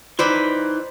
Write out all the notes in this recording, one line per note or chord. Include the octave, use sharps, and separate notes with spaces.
E3 D#4 C5 D5 B5